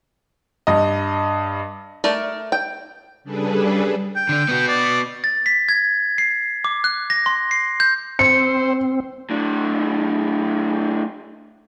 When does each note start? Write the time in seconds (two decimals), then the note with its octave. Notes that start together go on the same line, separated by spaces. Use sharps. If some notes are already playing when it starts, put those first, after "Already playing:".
0.67 G2 D#5
2.04 A3 A#4 D5
2.52 G5
3.24 C#3 G3 D4 G#4 A4 B4
4.16 G5
4.29 D3 D4
4.49 B3 F#4
4.68 D5
5.24 A6
5.46 B6
5.69 G#6
6.18 C7
6.65 D6
6.84 F#6
7.10 A#6
7.26 C6
7.51 C7
7.80 G6
8.19 C4 C5 C#7
9.30 A2 D4